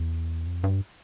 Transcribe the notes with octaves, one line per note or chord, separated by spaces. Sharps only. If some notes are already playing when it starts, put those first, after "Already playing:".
Already playing: E2
F2
G2